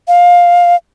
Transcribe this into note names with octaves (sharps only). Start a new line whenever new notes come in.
F5